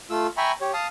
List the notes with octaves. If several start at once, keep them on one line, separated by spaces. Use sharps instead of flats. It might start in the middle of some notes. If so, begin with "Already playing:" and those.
A3 F4 E6
E5 G5 G#5 A#5 B5 C#6
G4 C#5
F5 A5 D#6